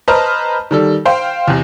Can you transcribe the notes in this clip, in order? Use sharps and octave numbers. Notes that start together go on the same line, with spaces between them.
B4 C5 D#5 A5 A#5 F6
D#3 G3 A4
C5 F5 G5 C6
E2 C3